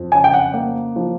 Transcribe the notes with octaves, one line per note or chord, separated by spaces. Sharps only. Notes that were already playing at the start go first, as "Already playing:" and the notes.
Already playing: F2
C#3 G#5
G5
F#5
A#3
F3